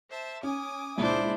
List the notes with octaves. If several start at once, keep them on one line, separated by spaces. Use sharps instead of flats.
C5 E5 A5
C#4 G#5 D6 D#6
C#2 A#2 D4 E4 C5